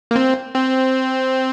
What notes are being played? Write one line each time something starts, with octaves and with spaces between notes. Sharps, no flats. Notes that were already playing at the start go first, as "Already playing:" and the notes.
A#3
C4
C4